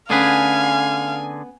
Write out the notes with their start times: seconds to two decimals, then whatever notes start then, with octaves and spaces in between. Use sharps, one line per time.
0.10 D3 A3 B3 C#4 G#4 B4 F5 G#5